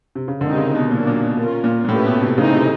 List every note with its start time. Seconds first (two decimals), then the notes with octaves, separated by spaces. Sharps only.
0.15 C3
0.28 C#3
0.41 D3 D#3 G#3 C4 D#4
0.53 C3
0.57 C#3
0.75 B2
0.91 A#2 D#3 F#3 A#3 D4
1.07 A#2
1.23 B2
1.40 C#4 F4 A#4
1.64 A#2
1.85 A#2
1.89 A2 A3 C#4 E4 G4 B4
2.05 B2
2.21 C3
2.37 C#3 E3 A3 C4 D#4
2.55 C3